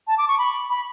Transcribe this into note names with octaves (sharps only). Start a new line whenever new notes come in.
A5
D6
C#6
B5
B5